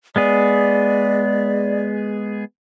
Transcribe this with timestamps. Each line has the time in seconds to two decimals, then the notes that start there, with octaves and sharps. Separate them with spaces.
0.16 G#3 B3 G#4 D5